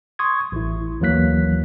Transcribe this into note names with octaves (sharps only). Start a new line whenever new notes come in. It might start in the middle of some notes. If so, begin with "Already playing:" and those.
C6 C#6 D#6 G#6
A1 E4
D#2 E3 F#3 A#3 F#6 B6